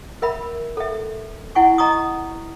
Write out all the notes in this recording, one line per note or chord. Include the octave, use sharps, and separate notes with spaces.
A#4 E5 B5
A4 E5
E4 F#5 G#5 C#6
D#5 A#5 C#6 D#6